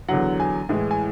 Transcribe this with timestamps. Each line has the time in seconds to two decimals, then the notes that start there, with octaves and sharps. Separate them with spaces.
0.09 E2 D3 F#3 F#5
0.40 G#5
0.69 A2 E3 G#3
0.91 G#5